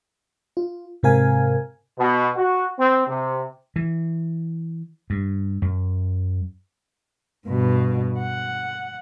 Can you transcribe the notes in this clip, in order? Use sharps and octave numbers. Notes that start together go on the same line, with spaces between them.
F4
G#2 C3 C4 A#4 F5 G#5
B2
F#4
C4
C3
E3
G2
F#2
G2 B2
F#5